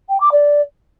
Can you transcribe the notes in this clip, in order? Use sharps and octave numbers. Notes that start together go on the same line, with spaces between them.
G5
D6
D5